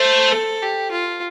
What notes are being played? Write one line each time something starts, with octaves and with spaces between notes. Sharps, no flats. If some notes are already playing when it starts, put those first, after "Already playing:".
Already playing: A3 C5
A4
G4
F4